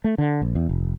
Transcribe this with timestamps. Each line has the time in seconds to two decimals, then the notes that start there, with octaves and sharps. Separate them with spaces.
0.04 A3
0.18 D3
0.42 A#1
0.55 E2
0.69 F1